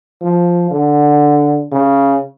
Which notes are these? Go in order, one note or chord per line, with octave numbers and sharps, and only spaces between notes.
F3
D3
C#3